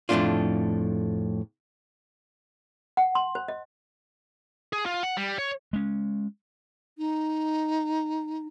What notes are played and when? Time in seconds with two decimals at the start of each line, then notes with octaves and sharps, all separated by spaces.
0.09 F2 A2 C3 A3 D4 F4
2.97 F#5
3.15 C6
3.35 C5
3.48 D#5
4.73 G#4
4.86 F4
5.03 F#5
5.17 G3
5.39 C#5
5.73 G#3 C#4
6.98 D#4